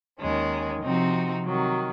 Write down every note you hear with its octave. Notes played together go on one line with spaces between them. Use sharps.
D#2 D#3 G#3 C#4
C3 F3 C4 D#4 F#4
C3 D#3 F#3